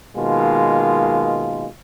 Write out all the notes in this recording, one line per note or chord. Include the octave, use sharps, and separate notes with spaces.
B2 D#3 G#3 A#3 F4